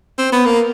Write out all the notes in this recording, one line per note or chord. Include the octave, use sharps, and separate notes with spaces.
C4
B3
A#3